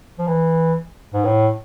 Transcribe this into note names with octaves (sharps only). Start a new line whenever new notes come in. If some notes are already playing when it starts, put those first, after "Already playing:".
F3
E3
G#2
A2